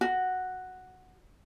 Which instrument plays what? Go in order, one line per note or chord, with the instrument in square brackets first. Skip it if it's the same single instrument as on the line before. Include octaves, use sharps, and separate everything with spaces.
[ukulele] F#4